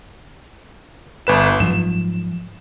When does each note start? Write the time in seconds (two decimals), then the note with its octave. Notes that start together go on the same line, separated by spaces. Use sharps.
1.27 G1 B4 E7
1.60 G#2 F3 F#3 E7